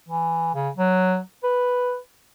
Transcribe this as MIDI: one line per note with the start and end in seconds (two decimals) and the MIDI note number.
0.09 0.53 52
0.55 0.70 49
0.77 1.20 54
1.44 1.98 71